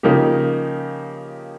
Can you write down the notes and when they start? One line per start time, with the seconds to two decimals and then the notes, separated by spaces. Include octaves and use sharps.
0.03 C#3 F3 A#3 D#4 G4